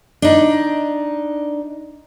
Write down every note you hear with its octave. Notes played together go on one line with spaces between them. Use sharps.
D4 D#4